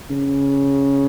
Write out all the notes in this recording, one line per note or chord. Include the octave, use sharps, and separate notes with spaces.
C#3